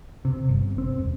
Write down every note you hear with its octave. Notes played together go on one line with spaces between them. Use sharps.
C3
G1
C4
E1